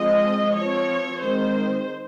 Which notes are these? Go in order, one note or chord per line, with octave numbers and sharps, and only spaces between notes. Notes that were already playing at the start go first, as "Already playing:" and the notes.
Already playing: F3 G#3 C4 D#5
F3 C4 C#5
D#3 G#3 C4 C5